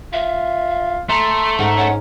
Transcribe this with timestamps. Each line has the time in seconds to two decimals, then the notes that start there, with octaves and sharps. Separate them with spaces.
0.13 F4 E5
1.09 A3 A#5 C6
1.59 G#2 A#4 F#5
1.77 C#4 F#5